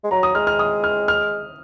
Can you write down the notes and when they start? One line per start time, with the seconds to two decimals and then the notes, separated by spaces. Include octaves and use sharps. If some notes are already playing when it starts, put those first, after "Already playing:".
0.04 G#3
0.11 F#3 A#5
0.23 D#6
0.35 G#3 F6
0.47 F6
0.59 D#6
0.84 F6
1.08 F6